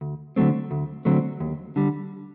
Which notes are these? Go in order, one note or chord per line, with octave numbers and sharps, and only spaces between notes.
D2
D3 F#3 A3 C4
D2
D3 F#3 A3 C4
D#2
D3 G3